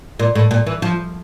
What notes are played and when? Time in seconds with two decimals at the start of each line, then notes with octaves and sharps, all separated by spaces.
0.19 A#2
0.35 A2
0.51 A#2
0.67 E3
0.82 F3